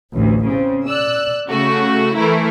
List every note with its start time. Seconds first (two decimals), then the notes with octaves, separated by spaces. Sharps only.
0.12 A1 D2
0.46 C#3 C4
0.87 D5 E6 F#6
1.49 C#3 A3 F#4
2.16 E3 A3 E4 A#4